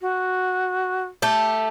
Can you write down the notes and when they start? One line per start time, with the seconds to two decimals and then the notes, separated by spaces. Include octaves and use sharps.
0.01 F#4
1.22 A3 G4